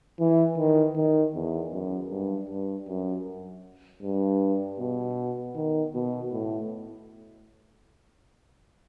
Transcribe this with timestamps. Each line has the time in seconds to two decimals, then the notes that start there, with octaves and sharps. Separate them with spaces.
0.20 E3
0.58 D#3
0.96 D#3
1.35 E2
1.73 F#2
2.11 G2
2.50 G2
2.88 F#2
4.03 G2
4.80 B2
5.56 D#3
5.95 B2
6.33 A2